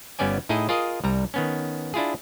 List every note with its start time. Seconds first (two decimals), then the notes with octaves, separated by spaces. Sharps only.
0.19 G1 G3 B3 C#4 D5 G#5
0.49 A2 D#4 E4 G#4 D#5
0.69 F4 G#4 A#4 D#5
1.04 C2 G3 A#5
1.34 D#3 B3 C#4
1.94 D4 E4 F4 G#4